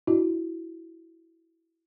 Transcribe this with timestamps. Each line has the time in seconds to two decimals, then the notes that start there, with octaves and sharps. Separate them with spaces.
0.07 D4 E4 F#4